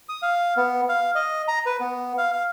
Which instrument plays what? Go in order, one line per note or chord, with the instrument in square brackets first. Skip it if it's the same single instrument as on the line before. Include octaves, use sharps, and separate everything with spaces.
[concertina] D#6
F5
B3
F5
D#5
A#5
B4
B3
F5
F5